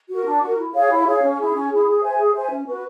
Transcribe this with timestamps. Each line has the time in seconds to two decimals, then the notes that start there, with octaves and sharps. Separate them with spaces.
0.09 F#4
0.14 A#4
0.26 D4
0.42 F#4 A#4
0.58 E4
0.74 G#4 C#5 F5
0.90 E4
1.06 G#4 C#5 F5
1.22 C#4
1.38 E4 G#4
1.53 C#4
1.70 E4 G#4
1.87 G#4
2.02 C5 E5 G#5
2.18 G#4
2.34 C5 E5 G#5
2.50 C#4
2.66 F#4 B4